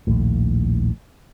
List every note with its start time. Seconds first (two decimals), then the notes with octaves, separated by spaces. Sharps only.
0.07 A#1 D#2 A2